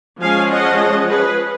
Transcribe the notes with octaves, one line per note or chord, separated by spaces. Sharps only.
F3 G#3 C#4 F5 G#5
D#5 F#5
G#4 B4